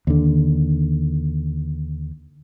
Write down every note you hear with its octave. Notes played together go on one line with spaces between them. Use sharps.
D#2 D3